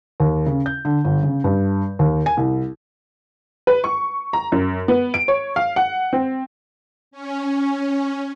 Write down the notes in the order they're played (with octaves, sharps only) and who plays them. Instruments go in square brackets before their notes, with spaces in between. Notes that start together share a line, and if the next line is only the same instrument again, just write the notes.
[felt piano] D#2
C#3
G6
D3
G1
C#3
G2
D#2
G#5
C2
[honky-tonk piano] B4
C#6
A#5
F#2
B3
D7
C#5
F5
F#5
C4
[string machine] C#4